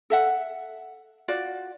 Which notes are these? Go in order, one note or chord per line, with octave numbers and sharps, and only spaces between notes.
A4 E5 F#5
F4 F#4 D5